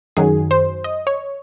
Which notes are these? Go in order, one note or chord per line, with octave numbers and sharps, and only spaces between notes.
F#2 D#3 F#3 G#4
C5
D#5
C#5